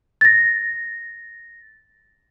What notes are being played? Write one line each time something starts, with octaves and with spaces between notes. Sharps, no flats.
A6 A#6